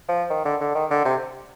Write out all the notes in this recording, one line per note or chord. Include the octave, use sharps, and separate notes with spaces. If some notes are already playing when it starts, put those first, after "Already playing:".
F3
D#3
D3
D3
D#3
D3
C3